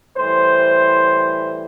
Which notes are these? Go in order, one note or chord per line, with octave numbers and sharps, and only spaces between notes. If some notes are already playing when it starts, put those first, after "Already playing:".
A2 E3 G3 C5